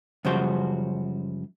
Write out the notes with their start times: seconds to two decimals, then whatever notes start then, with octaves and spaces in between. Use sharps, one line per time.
0.25 F#2 C#3 F3 G3 F#4 C5